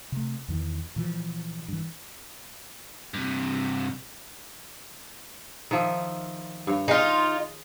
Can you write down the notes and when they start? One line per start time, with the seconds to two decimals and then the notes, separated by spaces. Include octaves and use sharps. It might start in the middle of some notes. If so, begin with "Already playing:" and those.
0.12 C3 A3
0.48 E2 D#3 E3
0.96 A#2 E3 F3
1.68 G2 E3
3.14 G2 C3
5.71 D#3 F3 E5
6.67 G2 C#5
6.88 D#4 F4 G#4